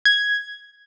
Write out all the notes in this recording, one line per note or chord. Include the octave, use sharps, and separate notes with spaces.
G#6